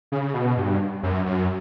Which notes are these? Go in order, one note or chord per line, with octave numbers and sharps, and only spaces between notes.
C#3
B2
G2
F#2
F#2